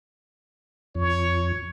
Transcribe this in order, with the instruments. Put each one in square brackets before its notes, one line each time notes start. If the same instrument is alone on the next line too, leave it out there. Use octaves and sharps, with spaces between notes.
[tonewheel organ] F2 [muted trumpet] C#5